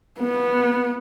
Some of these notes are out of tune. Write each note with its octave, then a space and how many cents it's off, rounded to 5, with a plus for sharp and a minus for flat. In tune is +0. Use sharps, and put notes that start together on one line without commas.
B3 -15